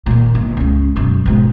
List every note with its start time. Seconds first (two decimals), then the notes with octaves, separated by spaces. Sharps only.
0.06 D#2 A#2
0.35 G1
0.57 C#2 C#3
0.96 F#2 B2
1.26 G#2 B2